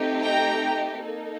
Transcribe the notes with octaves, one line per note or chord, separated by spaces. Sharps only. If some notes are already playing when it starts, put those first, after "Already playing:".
Already playing: A3 C4 D#4 G4
G5 A#5
A#3 D#4 A4